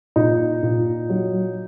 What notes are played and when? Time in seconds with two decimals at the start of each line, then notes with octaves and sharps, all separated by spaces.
0.16 A#2 D#4
0.63 A#2
1.09 F#3